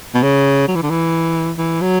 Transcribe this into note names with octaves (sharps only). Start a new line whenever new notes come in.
B2
C#3
F#3
E3
D3
E3
E3
F#3